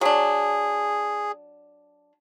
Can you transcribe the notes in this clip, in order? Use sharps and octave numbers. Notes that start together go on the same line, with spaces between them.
F#3 D4 G#4